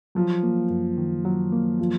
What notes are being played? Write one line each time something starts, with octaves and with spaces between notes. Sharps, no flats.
F3 F#3
A#3
F#2
D#3
F#3
A#3
F3